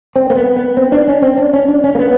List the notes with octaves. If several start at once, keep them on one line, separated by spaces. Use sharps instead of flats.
C4
A#3
B3
B3
C4
D4
C#4
C4
D4
C#4
D4
C#4
A#3
B3